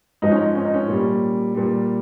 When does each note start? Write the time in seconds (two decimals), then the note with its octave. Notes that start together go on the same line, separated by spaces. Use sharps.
0.22 G#2 F3 D#4
0.31 C#4
0.41 D#4
0.55 C#4
0.64 D#4
0.74 C#4
0.88 A#2 G3
1.55 A#2 G3